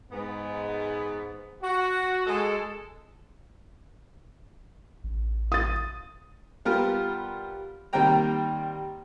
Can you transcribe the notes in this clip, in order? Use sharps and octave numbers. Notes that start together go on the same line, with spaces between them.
G#2 B3
F#4
G#3 A4
A1
D#6 A6
G3 B3 F4 G4 A#4
D#3 G3 A#3 C4 G5 A#5